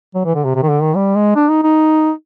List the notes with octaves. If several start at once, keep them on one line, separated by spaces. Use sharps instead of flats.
F#3
E3
D3
C3
C3
D#3
D3
D#3
G3
G#3
D4
D#4
D#4